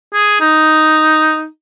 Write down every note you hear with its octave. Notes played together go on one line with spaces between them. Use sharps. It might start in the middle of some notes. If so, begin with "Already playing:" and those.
G#4
D#4